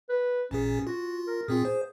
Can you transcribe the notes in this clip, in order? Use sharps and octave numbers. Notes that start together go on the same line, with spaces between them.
B4
A1 A#2 C#4 G#4
F4 F#4
A#4
A#2 C4 F4 G#4
C5